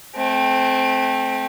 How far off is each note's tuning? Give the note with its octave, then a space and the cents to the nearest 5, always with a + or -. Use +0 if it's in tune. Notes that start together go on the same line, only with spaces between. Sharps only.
A3 -25 C4 +0